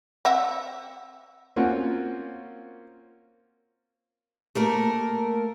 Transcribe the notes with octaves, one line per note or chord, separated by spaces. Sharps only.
C4 E5 F#5
A#3 C4 C#4 F4 F#4 F#5
A3 A#3 A#4